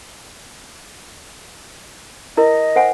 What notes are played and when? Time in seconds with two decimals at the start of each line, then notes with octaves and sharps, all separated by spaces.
2.37 E4 A#4 D#5
2.76 C5 F#5 G#5